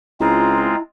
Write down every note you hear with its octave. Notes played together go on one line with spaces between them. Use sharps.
C#2 G#3 C4 E4 F4 A#5